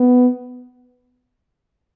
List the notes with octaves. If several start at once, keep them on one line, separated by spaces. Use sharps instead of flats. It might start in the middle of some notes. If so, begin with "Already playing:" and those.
Already playing: B3